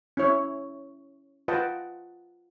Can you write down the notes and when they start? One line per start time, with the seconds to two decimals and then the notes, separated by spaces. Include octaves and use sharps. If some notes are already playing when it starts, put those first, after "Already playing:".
0.17 C#4 E4 C#5 E5
1.48 F4 B4 D#5 F#5 G5 A5